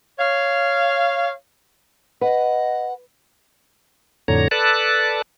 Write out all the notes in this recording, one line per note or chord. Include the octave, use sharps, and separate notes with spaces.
C#5 F5
B4 D#5 F#5
F2 A2 D3 C#5 A#5
A4 B4 D5 A5 F#6